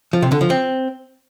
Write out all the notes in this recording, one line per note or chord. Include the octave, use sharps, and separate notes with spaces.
F3
C3
D3
F3
C4